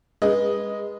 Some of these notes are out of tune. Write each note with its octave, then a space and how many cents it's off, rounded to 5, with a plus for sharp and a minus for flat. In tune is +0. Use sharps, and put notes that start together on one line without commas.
G#3 -20 B4 -25 D#5 +0